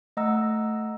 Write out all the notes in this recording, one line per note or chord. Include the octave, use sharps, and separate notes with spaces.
A3 D#5 F#5 A#5 E6